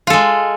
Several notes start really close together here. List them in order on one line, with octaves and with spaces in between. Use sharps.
F4 A4 G#3